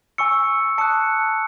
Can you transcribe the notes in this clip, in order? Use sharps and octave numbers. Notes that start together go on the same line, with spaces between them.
G#5 C#6 E6 C#7
A5 D#6 F#6 C#7